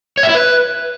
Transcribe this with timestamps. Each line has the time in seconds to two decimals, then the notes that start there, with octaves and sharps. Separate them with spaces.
0.17 C#5
0.23 E5
0.29 E4
0.35 B4